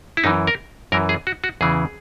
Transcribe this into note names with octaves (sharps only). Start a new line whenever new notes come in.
E4
F#2 E3 D#4
A#4
F#2 E3 A#4
G#4
F#4
F#4
E2 C#3 E3 G#4